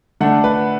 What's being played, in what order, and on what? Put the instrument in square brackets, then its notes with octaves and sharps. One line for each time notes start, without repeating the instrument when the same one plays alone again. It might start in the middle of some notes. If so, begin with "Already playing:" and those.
[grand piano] D3 A3 D4 F#5
B4